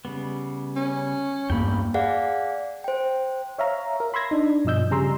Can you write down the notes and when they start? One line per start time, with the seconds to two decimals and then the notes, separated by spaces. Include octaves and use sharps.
0.05 C#3 G3 B3
0.76 C#4
1.50 E2 G2 A#3 G5 B5
1.94 G#4 D5 F5 F#5
2.84 C5 G5
3.59 C#5 E5 F5 A#5
4.00 A#4
4.14 B5 C6 E6 G#6 A#6
4.31 D4 D#4
4.65 G2 B2 F3 D#5 E6 G6
4.90 C#3 G3 G#4 A#5 C6 E6